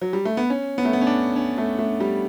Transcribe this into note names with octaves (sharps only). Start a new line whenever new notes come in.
F#3
G3
A3
B3
C#4
B3
A3
B3
C#4
D4
C#4
A3
A3
G3